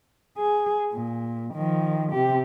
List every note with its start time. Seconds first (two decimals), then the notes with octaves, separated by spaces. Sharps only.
0.38 G#4
0.93 A#2
1.54 D#3 F3
2.12 C3 G4